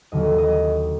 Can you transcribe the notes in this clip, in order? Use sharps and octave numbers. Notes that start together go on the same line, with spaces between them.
D#2 D3 F#3 A#3 D#5
D#5